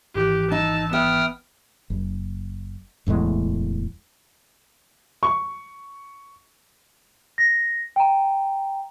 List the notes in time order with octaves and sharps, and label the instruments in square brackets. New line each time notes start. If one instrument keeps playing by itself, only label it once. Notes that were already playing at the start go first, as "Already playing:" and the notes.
[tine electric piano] G#1 E3 F#6 [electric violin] G4
[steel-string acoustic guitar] D#4 [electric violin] A5 E6
[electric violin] B3 [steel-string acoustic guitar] E5 [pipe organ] G5 D#6 F6
[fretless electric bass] F#1
D1 E2 A2 G#3
[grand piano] C#6
[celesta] A#6
G5 A#5